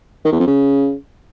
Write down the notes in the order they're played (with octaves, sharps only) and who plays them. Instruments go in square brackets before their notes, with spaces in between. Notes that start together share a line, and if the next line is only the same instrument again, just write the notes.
[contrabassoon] D#3
E2
F2
C#3